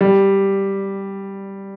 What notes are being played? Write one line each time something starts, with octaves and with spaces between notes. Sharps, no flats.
G3